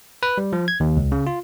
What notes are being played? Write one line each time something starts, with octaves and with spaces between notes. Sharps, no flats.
B4
G3
F3
G#6
D#2
C#2
C#3
F4